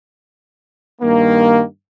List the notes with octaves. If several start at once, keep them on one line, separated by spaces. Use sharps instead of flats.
G2 D#3 A#3